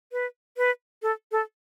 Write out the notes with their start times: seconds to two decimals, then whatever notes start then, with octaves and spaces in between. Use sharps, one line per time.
0.12 B4
0.57 B4
1.02 A4
1.32 A4